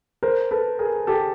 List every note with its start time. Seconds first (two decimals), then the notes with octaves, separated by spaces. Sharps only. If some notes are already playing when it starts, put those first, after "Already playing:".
0.23 A#4 C5
0.51 A4 B4
0.79 G#4 A#4
1.07 G4 A4